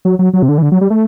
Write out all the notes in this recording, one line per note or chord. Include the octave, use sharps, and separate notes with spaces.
F#3
F#3
F#3
C3
D3
E3
D3
F#3
G3
A3